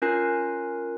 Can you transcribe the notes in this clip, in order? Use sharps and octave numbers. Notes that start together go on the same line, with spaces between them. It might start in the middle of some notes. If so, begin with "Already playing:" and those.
C#4 F4 A#4 G#5 F#6 C7